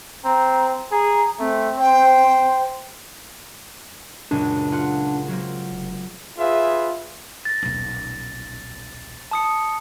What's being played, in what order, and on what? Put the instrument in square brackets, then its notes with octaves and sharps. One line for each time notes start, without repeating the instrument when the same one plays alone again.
[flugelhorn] C4 [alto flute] A#5
[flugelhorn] G#4 [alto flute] A#5
[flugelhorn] A3 [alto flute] C4
[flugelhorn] C5 [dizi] G5
[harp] C#2 F#2 A#2 [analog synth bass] D4
[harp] F4 F#5
F#3 A#3 C4
[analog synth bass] F1
[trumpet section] F4 G#4 B4 E5
[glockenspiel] A6 A#6
[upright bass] D#1 B1
[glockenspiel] A5 D#6 C#7